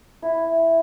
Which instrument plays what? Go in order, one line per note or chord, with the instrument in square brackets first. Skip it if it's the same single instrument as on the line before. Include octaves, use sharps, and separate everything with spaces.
[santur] E4